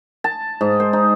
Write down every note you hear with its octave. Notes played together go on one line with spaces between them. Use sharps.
A5
G#2
C5
D#4